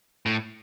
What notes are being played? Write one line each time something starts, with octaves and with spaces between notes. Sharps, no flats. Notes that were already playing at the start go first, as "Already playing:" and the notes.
A2